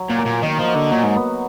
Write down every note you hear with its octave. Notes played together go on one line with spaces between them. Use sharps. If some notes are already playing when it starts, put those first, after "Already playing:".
Already playing: F#3
A#2
A#3
A#2
D#3 D#4
F3
F#4
D3
A#2 F#3
G#2
B3